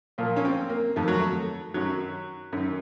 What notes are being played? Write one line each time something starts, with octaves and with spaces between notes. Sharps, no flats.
A#2 F3 A#3
C#4
C4
A#3
F2 D#3 A3
F#3
A3
F#2 D#3 F#3
F#2 D#3